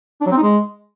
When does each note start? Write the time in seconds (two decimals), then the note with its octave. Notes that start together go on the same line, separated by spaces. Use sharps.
0.21 D4
0.26 F#3
0.32 C4
0.37 D#4
0.42 G#3